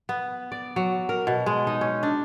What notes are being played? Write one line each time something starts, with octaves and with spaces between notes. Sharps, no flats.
B3
D5
F#3
A#4
B2
G#3
D#4
C#4
D4